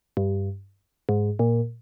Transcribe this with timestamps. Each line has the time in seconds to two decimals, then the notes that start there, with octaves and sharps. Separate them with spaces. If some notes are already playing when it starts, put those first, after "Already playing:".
0.17 G2
1.09 G#2
1.39 A#2